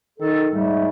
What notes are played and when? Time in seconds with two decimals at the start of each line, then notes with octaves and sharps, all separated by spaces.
0.19 D#3 A4
0.51 G#2 G3 A3